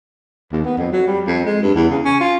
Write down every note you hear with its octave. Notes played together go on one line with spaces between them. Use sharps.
D#2
B3
F2
F#3
G3
F2
G#3
G2
E2
C#3
C#4
F4